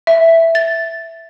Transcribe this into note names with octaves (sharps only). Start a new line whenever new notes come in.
E5
A6